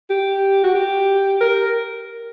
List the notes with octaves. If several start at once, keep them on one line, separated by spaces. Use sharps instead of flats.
G4
F#4
G4
A#4